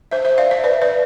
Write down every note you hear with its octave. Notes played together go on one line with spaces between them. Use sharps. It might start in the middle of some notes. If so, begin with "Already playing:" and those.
C5 E5
C5 E5
D5 F5
C5 E5
B4 D5
B4 D5